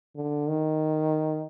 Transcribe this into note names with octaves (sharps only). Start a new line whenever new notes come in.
D3
D#3